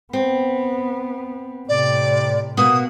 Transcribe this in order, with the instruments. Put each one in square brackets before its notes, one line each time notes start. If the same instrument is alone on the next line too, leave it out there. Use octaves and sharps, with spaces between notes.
[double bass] B3 [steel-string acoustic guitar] C4
[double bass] A2 C3 [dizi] D5
[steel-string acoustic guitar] B2 A#3 F#4 [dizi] D#6